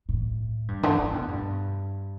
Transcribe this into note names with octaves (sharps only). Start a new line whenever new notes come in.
A2
G2
D3
C#3
B2
G2